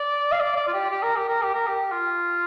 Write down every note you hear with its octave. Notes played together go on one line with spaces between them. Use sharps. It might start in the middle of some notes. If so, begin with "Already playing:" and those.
Already playing: D5
F5
D5
D5
F4
G4
G4
A#4
G4
A#4
G4
A#4
G4
F4